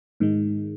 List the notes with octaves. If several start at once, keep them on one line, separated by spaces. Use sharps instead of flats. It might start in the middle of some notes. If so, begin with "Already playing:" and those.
G#2 D#3 G#3